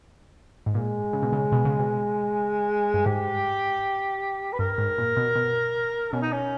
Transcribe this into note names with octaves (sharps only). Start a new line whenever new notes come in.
G#2
A#2 G#3
C#3
B2
C#3
B2
C#3
B2
G2
G#2 G4
B4
G2 A#4
G#2
A#2
B2
B2
B2 C#4
D#4
C#4